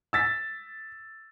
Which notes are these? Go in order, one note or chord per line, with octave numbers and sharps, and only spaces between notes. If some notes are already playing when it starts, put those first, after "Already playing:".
E6 A6 B6